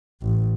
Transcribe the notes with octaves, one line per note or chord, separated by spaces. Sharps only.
A1